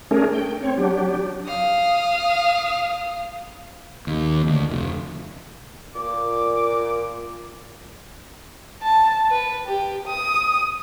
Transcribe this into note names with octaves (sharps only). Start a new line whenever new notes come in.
A3 C#4 D4 G#4 A#4
G5
C4 C#5
F#3 D4 G4
F5 D#6
D#2
D2
F1
A#2 D6
A5
B4
G4
D#6